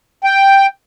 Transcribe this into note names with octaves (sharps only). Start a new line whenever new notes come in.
G5